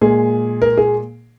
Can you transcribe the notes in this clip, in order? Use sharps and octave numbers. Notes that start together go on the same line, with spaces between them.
A#2 G#3 G#4
A#4
G#4